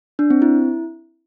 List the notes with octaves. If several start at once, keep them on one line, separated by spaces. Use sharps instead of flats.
D4
C4
E4